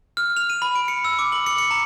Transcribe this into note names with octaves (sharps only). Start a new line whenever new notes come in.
F6
F7
D#7
B5
D7
C#7
E6
D6
F#7
C#7
C#7
A#5